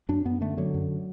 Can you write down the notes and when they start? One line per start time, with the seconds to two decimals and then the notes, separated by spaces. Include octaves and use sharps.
0.09 F#2 D4
0.25 F#2 B3
0.41 D3 A3
0.57 D3 F#3
0.74 F#2